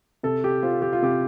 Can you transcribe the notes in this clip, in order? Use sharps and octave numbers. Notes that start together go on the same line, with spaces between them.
C3 A4
G4
C4 F4
G4
F4
C3 G4